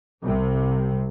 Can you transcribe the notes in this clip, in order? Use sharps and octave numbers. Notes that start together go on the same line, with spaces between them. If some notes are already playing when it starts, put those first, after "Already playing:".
C2 C3